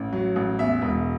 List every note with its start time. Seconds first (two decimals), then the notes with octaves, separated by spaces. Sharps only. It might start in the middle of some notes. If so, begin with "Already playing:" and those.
Already playing: A1
0.13 F#3
0.36 A1
0.59 E2 E5
0.82 E1